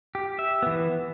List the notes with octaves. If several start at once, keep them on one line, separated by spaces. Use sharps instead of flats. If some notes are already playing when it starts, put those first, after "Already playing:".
G4
E5
E3 B3